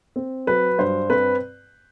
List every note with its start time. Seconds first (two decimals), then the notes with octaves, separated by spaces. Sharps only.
0.16 C4
0.47 F#3 B4
0.78 G2 C5
1.10 C4 B4